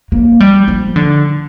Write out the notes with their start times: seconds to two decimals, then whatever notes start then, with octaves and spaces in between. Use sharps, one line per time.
0.12 A#3
0.40 G3
0.68 F3
0.96 D3